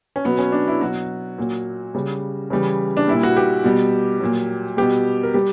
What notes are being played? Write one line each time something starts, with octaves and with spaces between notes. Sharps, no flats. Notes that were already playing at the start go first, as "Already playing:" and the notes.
C#4
B2 F#3 B3
C#4
D4
E4
B2 F#3 F#4
A#2 F#3
C#3 G3
C#3 E3 G3
D4
A#2 G3 E4
F#4
G4
B2 G3
A#2 F#3
B2 G3 G4
A#4
G3 G4